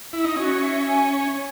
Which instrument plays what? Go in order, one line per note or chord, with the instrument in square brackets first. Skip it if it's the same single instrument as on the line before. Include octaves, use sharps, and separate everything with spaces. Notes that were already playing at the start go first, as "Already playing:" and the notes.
[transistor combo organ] E4
D#4
[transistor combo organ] C#4 [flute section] F#4
[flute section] E5
G#5
C#5